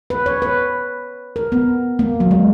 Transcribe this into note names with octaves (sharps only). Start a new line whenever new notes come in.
B4
C#5
B4
A#4
B3
A#3
F#3
G#3